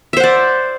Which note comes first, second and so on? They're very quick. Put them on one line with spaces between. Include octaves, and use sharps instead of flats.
E5 C5 F#5 D5